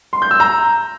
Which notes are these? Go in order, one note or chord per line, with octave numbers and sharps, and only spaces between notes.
C6
G6
E6
A#5